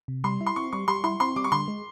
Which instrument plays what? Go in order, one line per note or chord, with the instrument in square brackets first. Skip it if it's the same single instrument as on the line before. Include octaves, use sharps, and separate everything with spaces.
[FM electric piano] C3
[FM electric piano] G3 [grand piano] C6
[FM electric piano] E4
[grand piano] C6
[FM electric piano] C4 [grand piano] C#6
[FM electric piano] G3 [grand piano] C#6
[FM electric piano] G3 [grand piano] C6
[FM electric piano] E4 [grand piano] C6
[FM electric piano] C4 [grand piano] C6
[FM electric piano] G3 [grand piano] D6
[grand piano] C#6
[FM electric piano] D3 [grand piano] C6
[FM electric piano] G#3